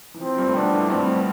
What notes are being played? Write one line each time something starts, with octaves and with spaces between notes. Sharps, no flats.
E3
F3 C4
G2 G3
A3
B2 B3 D4
A2 A3
G2 G3 C4